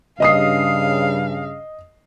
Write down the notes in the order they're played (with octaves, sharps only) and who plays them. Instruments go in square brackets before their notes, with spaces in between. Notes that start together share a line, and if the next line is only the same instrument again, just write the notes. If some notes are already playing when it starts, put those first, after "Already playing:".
[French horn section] G2 C#3 [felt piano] D#5 D#6 C7 [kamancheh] F5